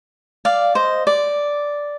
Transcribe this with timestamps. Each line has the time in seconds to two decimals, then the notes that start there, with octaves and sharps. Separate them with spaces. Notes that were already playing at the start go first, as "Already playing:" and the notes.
0.45 D5 F5
0.75 C5 D#5
1.07 D5